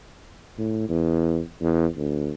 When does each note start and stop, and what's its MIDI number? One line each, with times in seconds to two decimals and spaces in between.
0.58 0.89 45
0.89 1.40 40
1.61 1.87 40
1.97 2.33 38